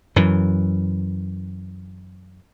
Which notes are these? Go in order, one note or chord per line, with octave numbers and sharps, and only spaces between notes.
F#2 E3